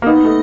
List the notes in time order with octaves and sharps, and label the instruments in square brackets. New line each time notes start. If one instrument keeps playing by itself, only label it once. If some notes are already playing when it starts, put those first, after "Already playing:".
[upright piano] A#3
[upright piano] B3 [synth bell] D#4
[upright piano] A3